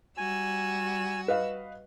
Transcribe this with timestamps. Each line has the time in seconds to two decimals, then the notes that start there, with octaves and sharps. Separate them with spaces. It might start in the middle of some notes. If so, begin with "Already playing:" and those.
0.18 G3 F#4 G#5 E6
1.28 B4 D#5 F5